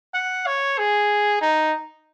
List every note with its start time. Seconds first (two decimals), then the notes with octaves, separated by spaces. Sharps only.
0.14 F#5
0.46 C#5
0.78 G#4
1.41 D#4